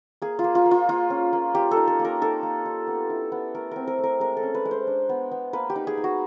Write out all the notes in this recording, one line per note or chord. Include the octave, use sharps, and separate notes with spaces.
A#3 G#4
F4
A#3
F4
A#3
F4
A#3 F4
C#4
A#3
A#3 G4
A4
D#4
A4
A#3
A#4
D#4 A4
A#3
D#4
B3
E4
B3
A3 A#4
C4 A#4
A#4
A3
A#4
G#3 A#4
A4
C#4
B4
G#3
C5
D4
B3
B3
A#3 B4
G4
D#4
G#4
D#4
F#4